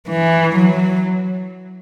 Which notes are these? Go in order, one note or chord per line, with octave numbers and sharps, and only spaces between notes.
E3
F#3